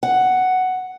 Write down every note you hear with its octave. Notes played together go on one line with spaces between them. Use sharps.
F#5